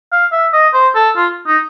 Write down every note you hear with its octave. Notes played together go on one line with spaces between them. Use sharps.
F5
E5
D#5
C5
A4
F4
D#4